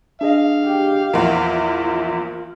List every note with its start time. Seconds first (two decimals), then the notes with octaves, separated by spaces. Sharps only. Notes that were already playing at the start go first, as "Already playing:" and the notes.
0.21 D4 G#4 D#5 F5
0.64 G4
1.14 A#1 E2 F4 A#4 F#5